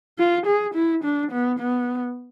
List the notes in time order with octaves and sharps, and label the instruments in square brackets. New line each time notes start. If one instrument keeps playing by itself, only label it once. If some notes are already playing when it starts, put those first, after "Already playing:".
[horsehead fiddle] F4
G#4
E4
D4
B3
B3